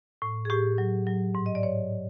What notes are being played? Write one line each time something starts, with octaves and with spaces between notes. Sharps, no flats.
A2
G#4
A2 G4
F#3
F#3
G#2
D#5
D5
G#2 C#5